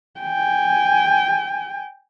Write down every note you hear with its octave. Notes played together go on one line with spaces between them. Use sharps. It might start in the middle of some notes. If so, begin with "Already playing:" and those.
G5 G#5